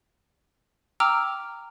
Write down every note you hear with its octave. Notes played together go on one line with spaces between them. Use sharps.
G5 A#5 D6 E6 F6